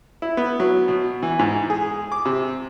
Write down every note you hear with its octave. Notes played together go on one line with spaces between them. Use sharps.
E4
B3
F#3
B2
E3
G#2
G#4
D6
C3